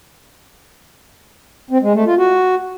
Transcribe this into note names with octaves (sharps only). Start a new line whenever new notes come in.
C4
G#3
A3
F4
F#4